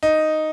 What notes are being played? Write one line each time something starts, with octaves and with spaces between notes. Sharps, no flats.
D#4